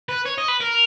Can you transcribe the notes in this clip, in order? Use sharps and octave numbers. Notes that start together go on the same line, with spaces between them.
B4
C#5
D#5
B4
A#4